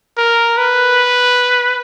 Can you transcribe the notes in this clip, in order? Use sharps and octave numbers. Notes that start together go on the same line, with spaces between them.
A#4
B4